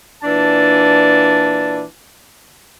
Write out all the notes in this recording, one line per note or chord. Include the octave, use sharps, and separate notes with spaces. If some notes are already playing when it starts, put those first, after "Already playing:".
A#2 E3 D4 A5